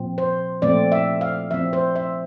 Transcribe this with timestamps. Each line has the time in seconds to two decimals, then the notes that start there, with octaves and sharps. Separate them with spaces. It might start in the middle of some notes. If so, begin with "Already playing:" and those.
Already playing: A#2 F3 C4
0.18 C5
0.62 A#2 F3 A3 C4 D5
0.92 E5
1.21 F5
1.51 F3 C4 E5
1.73 C5
1.96 E5